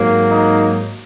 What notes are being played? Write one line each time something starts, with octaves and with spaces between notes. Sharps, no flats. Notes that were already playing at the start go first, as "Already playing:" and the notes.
Already playing: G#2 F#3 A#3
D#4